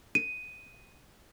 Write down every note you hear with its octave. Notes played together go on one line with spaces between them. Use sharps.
D#7